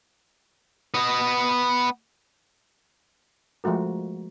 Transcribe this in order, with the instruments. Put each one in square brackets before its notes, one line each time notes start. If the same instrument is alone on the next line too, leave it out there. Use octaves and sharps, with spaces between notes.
[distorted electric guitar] B3 D#5
[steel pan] F3 G#3 A3 F#4 A#4